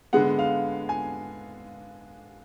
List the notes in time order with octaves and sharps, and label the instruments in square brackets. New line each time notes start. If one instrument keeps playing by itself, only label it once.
[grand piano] D3 G#3 B3 F#5
F5
G#5